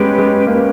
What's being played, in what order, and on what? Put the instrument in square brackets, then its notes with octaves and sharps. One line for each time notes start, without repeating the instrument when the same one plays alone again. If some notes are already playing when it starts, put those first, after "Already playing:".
Already playing: [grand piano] G#3 B3 [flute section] C#4 G4 B4
[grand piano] G#3
[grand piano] A#3 [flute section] C#4 G4 B4